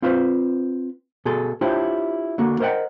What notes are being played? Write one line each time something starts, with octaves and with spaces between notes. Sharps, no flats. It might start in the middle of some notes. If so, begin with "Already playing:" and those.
C4 F4 B4 C5
B2 G#4 A4 C6
D4 E4 F4 G4 C5 C#5
D3 A#3 F#4
A#4 C5 D#5 E5 F#5 G5